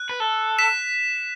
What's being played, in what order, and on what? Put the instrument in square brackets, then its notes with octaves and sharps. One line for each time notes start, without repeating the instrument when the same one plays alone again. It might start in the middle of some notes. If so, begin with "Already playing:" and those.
Already playing: [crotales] F#6
[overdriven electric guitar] B4
A4
[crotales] B6 E7